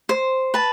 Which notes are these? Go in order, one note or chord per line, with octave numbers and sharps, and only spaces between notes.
C5
B4 A5